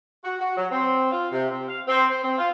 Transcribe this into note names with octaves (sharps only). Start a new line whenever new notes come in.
F#4
F#4
F#3
C4
F4
C3
C4
F5
C4
C5
C4
F4